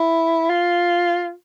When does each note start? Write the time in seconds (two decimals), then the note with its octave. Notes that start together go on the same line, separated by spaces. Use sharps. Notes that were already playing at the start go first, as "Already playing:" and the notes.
Already playing: E4
0.50 F4